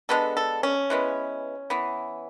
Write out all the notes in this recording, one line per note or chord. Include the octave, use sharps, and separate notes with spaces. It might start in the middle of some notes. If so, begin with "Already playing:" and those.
D3 G#3 B3 A4
A4
C#4
E3 G#3 B3
E3 B3